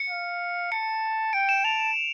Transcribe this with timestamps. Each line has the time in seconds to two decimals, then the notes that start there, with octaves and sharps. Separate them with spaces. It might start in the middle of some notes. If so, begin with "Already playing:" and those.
Already playing: C#7
0.10 F5
0.72 A5 C#7
1.33 G5 D7
1.49 E7
1.64 A5 F7